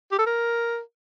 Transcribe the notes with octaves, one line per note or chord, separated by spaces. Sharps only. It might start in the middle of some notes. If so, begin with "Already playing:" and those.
G4
A4
A#4